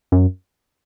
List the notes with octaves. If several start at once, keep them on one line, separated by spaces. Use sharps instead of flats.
F#2